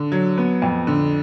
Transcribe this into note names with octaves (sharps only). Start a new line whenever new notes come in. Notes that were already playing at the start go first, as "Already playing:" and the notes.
Already playing: D3
F#3
B3
F2
D3